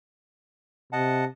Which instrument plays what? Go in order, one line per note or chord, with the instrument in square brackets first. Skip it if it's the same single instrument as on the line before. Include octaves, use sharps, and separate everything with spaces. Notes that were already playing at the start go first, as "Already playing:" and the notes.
[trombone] C3 [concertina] D#5 F#5 A5